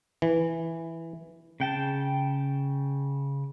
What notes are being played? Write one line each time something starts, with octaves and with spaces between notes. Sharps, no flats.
E3
C#3 G5 A5